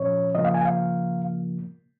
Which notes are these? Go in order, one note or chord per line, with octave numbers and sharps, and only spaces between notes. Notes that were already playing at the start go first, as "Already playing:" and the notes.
Already playing: A#2 F3 C#4 C#5
C#3 F3 A#3 D#5
F5
G#5
F5